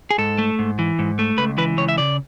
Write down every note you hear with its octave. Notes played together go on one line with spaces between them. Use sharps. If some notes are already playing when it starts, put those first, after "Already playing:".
G#4
G#2 A4
A3
G#2
E3
G#2
A3
C#2 B4
E3 B4
C#2 C#5
E5
C#3 D5